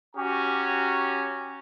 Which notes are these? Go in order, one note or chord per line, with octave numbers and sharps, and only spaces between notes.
C#4 F#4 G4 A#5